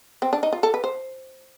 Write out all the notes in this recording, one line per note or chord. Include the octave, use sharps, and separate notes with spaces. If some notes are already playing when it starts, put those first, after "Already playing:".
C4
D4
D#4
F4
A4
B4
C5